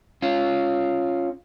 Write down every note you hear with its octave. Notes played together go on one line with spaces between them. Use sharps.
C#4 F4